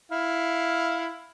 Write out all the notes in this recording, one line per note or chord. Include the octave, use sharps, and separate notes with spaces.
E4 F5